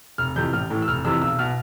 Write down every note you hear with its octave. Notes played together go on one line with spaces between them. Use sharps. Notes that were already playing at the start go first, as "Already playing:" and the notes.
F1 F6
F2 C3 E3 G6
A1 F6
A2 E3
E6
F1 F6
F2 C3 E3 E6
B1 E6
B2 F6